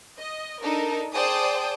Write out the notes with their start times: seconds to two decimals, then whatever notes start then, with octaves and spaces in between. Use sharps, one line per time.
0.19 D#5
0.62 D4 D#4 A4 A#4
1.13 G#4 C5 D5 G5 A5 D#6